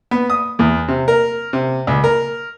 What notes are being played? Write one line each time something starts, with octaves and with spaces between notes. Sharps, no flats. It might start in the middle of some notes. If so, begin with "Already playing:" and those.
B3
D#6
E2
C3
A#4
C3
C#2
A#4